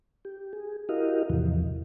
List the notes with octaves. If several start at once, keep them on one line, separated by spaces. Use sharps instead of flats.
G4
G#4
E4 F#4 G4 A#4 D#5 F5
E2 A2 C3 E3 F3